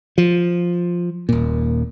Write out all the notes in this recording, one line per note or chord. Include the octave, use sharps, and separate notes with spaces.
F3
D#1 A#2